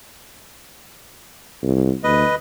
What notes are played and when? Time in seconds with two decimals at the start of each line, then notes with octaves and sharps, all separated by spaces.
1.63 C2
2.04 D2 B4 D#5